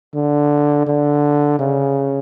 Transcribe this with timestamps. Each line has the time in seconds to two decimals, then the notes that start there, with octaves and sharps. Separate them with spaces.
0.15 D3
0.87 D3
1.59 C#3